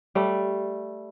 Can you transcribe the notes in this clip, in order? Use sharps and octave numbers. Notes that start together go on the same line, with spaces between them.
G3 A3